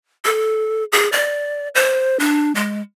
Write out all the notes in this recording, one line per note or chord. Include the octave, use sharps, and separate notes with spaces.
A4
G#4
D5
C5
D4
G#3